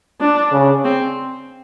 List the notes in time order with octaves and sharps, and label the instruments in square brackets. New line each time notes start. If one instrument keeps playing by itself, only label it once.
[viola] D4
[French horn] C#3
[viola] C4